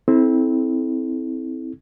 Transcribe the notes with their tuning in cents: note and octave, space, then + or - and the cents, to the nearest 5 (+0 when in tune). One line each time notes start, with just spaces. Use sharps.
C4 +0 E4 -30 A4 -30